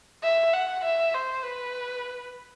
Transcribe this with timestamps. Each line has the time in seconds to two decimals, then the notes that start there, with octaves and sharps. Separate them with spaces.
0.23 E5
0.54 F#5
0.84 E5
1.14 C5
1.44 B4